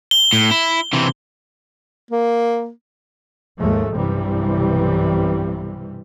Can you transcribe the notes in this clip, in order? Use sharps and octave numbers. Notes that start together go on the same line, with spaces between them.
G7
A2
E4
C3 E3
A#3
D#2 G#2 F3 G#3 A3
B1 G2 C3 E3 G3